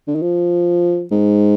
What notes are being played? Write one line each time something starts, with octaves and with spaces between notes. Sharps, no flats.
D3
D#3
F3
G#2